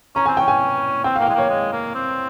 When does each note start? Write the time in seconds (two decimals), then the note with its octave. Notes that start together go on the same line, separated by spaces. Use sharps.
0.15 C#4 A#5
0.26 C4 G#5
0.37 C#4 G5
0.48 G#5
1.04 C4 G5
1.16 F5
1.19 A#3 G5
1.27 G#3 F5
1.34 A#3 C#5
1.49 G#3
1.72 A#3
1.94 C4